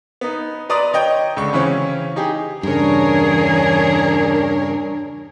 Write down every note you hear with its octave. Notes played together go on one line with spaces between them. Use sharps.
B3 D#4
B4 D5 A#5 C6 D#6
C#5 D#5 G5 G6
C#2 D3 C#6
C#3 E3 C4 C#4
D#4 G4 G#4
E2 G2 C#3 D4 G#4 A#4 C#5